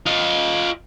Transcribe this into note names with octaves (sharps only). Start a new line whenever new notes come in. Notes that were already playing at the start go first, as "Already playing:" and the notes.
F4 D#5